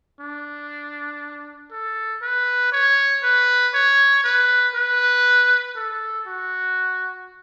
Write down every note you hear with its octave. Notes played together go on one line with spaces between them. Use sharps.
D4
A4
B4
C#5
B4
C#5
B4
B4
A4
F#4